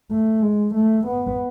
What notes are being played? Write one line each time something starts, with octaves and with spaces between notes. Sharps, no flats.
A3
G#3
A3
B3